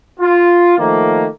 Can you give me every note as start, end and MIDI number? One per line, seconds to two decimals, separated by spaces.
0.19 0.76 65
0.78 1.26 51
0.78 1.26 53
0.78 1.26 57
0.78 1.26 58